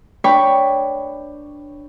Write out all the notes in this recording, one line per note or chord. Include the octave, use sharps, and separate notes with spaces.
D4 B4 C#5 G5 B5 C#6